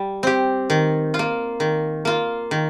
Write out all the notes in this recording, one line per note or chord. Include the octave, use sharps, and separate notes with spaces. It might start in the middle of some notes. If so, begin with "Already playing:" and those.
Already playing: G3
C4 G4
D#3
F4
A#3
D#3
A#3 F4
D#3